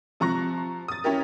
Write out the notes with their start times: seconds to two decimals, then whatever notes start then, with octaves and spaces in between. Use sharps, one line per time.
0.20 C3 F3 A#5 C#6 F#6 A#6
0.88 D#6 A6
1.04 C#4 E4 G4 A#4